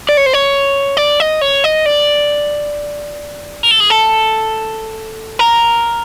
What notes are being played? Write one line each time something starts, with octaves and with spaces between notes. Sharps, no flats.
D5
C#5
C5
C#5
D5
D#5
C#5
D#5
D5
A#4
A4
G#4
A4
A#4